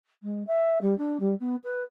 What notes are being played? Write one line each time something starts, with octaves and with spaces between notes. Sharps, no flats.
G#3
E5
G3
D4
G3
B3
B4